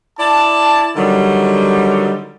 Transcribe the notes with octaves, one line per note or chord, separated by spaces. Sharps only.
E4 D5 A5
D3 D#3 F#3 G3